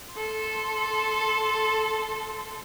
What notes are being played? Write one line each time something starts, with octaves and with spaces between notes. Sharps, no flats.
A4 C6